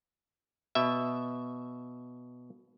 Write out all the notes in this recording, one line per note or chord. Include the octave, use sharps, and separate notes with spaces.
B2 E5